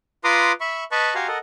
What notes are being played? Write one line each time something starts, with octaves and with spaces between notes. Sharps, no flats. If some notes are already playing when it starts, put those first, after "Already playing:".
F4 B4 A#5 C6 D6 D#6
E5 B5 C#6
B4 D#5 A5 B5 C#6
F#4 G4 F5 G#5 A#5 C6
A4 A#4 D#5 F#5